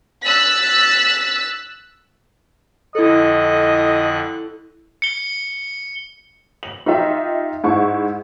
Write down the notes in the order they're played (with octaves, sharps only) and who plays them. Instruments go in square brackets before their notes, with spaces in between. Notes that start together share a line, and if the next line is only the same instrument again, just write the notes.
[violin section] E6 F#6 A6 B6
[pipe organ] F2 D3 F#6 [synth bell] E4 A4 [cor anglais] D#5
[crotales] C#7 G7
[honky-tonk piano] F#7
D#4 F4 G4 D#5 E5
G#2 E4 C#6